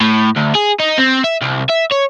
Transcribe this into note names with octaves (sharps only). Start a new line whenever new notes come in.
A2
D2
G#4
D#4
C4
E5
C2
E5
C#5